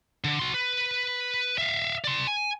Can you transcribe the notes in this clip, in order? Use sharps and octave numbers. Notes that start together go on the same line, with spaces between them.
D3
F#4 C6
B4
E5 F5
D5 C6
G#5